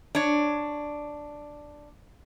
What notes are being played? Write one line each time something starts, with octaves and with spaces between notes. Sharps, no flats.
D4 C#5